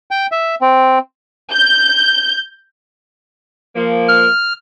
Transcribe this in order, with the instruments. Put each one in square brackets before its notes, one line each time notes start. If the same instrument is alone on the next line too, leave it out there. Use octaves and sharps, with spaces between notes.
[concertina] G5
E5
C4
[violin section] G6
[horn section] F3 A#3
[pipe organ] F6